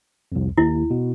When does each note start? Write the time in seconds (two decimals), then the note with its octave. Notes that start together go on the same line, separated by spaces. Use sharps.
0.32 C2 F2
0.57 D#2 E4
0.91 B2